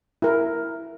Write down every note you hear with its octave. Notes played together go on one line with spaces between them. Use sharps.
E4 A#4